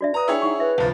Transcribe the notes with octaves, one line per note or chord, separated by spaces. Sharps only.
D4 F#4 D5 E5
B4 A#5 D#6
D4 E4 G#4 C#5 G5 E6
D#4 F#5 C#6
B4 E5
G1 C2 F3